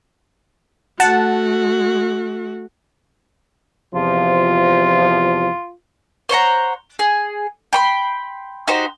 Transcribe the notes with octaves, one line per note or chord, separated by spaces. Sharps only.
A3 F#4 F#5 A5
E2 C3 F3 F4
C5 C#5 F#5 A#5
G#4
G5 B5 C6
D#4 F#4 G4 C5